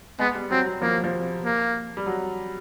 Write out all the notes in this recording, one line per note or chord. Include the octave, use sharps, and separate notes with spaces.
G#3 B3
G3
F#3 C4
F#3
F3 A#3
F3
A#3
G3
F#3